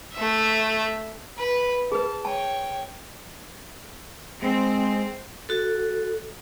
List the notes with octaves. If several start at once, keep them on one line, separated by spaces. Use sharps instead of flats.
A3 E5
B4
G#4 B4 A5
C#5 G5 A5
G#3 C4
F#4 A4